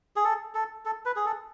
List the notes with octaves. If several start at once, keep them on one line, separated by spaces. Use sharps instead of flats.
G#4
A4
A4
A4
B4
G#4
A4